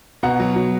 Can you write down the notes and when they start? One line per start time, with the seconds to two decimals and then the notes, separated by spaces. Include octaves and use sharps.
0.23 B2 F#5 A#5
0.40 F#3
0.56 F#3